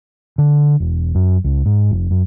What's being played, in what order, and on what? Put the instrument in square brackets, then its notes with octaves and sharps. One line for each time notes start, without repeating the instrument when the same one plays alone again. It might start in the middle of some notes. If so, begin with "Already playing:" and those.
[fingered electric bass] D3
E1
F#2
C#2
G#2
F1
F#2